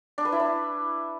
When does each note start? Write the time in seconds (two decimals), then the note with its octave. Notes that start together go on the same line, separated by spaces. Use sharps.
0.18 D4
0.25 B4
0.32 E4
0.40 D4